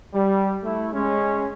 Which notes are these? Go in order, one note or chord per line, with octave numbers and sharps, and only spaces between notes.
G3
A3 E4
G#3 C#4